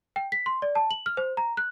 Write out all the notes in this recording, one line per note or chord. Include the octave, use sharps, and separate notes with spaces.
G5
B6
C6
D5
A5
F#7
F6
C5
A#5
F#6